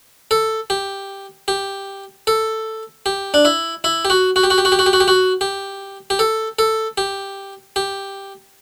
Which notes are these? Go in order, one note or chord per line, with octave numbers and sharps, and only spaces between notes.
A4
G4
G4
A4
G4
D4
E4
E4
G4
F#4
F#4
G4
F#4
G4
F#4
G4
F#4
G4
F#4
G4
F#4
G4
G4
A4
A4
G4
G4